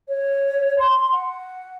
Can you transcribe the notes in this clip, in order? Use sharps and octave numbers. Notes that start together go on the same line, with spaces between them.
C#5
C6
F#5